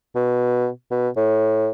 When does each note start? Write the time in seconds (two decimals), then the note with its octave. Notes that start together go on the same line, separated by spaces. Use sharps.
0.16 B2
0.91 B2
1.17 A2